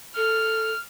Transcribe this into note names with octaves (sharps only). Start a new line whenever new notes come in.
A4 F6